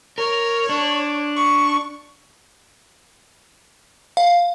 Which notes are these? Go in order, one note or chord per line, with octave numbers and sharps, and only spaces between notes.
A#4 C#5
D4
C#6
F5